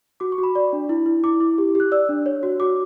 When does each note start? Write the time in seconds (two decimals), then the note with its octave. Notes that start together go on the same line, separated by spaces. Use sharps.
0.20 F#4 D6
0.32 C#6
0.38 F#4
0.43 B5
0.55 D5
0.73 D4
0.89 E4
1.06 E4
1.24 E4 D6
1.40 E4
1.58 G4
1.75 G4 F#6
1.92 D5 E6
2.09 D4
2.26 C#5
2.43 F#4
2.60 F#4 D6